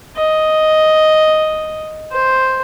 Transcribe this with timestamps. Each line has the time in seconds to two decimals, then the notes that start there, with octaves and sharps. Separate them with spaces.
0.17 D#5
2.12 C5